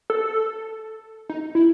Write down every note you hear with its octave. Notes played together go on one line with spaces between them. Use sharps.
A4
D#4
E4